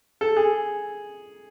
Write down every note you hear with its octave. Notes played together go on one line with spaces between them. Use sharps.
A4
G#4